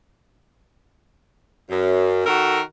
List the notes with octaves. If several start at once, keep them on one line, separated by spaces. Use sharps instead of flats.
F#2
D#3 F#4 A4 A#4